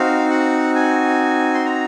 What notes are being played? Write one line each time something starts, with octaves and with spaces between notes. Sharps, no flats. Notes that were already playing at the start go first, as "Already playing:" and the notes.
Already playing: C4 D#4 F#4 F5
F#5
G#5
C6
A#5